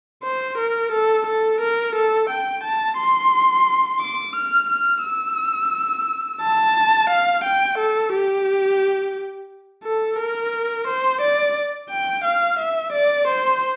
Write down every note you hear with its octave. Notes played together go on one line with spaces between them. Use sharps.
C5
A#4
A4
A4
A#4
A4
G5
A5
C6
D6
F6
F6
E6
A5
F5
G5
A4
G4
A4
A#4
C5
D5
G5
F5
E5
D5
C5